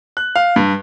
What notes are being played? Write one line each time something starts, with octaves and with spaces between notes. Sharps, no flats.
F#6
F5
G2